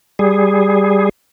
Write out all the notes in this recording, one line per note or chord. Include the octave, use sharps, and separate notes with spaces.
G3 G#4